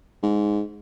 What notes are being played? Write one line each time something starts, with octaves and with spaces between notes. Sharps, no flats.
G#2